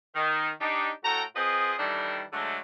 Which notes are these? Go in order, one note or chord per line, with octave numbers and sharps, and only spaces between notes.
D#3
D4 D#4 G4
A2 F#4 A4 G5 A#5
C4 F4 G#4 B4 D#5
D#3 E3 G3 A3 D4
D3 F#3 G#3 A3